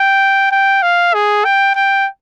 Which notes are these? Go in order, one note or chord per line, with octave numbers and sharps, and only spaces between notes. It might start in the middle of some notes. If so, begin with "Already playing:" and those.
Already playing: G5
G5
F5
G#4
G5
G5